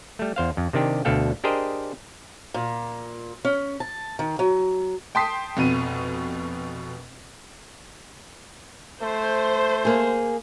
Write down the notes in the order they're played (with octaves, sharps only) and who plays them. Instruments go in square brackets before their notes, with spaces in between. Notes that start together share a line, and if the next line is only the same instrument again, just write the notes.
[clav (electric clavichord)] G3 A3
E2 C5 F5
F2
C3 D#3 D4 G4
D2 B2 D4 A4 F5 G5
D4 G4 G#4 A#4 C5 D#5
[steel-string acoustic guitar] A#2
C#4
A5
D#3
F#3
[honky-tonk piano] G5 A5 C6 D#6 B6 C7
F1 F2 B2 D#7
[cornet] A3 [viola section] C5
[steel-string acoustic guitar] A#3 G#4